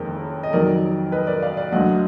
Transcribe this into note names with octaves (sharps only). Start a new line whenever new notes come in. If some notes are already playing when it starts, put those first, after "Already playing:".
Already playing: F#1 F2 D#3 G#3 A#4
D#5
F2 D#3 F#3 A#4 D5
B4 D#5
A#4 D5
D5 F5
D5 F5
D2 D3 F#3 D#5 F#5